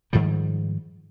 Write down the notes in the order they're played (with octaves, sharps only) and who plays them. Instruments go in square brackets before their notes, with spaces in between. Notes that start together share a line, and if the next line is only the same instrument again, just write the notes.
[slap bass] G#2 D#3 F3 G3